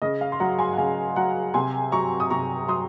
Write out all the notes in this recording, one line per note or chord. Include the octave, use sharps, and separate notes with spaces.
C#3 D#5
F5
C6
F#3 F#5 A#5
G#5 C6
F#5
C#3 F5 G#5
F#3 F#5 A#5
C3 G#5 C6
F#3 A#5 C#6
D#6
C3 A#5 C#6
F#3 C6 D#6